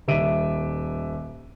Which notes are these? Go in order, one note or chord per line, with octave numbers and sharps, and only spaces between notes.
D#1 D#3 G3 E5 D7 D#7